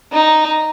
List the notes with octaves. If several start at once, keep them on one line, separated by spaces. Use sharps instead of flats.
D#4